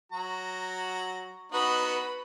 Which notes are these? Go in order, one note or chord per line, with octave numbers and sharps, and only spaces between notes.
F#3 F#4 A#5
B3 D#4 F#4 B4 B5